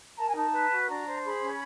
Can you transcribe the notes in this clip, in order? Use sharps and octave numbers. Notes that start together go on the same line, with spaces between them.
A#5
A#4 A5
G#5
D#4 A5
B4
F#4
D4 A#5
C5
G#4 B5
C#4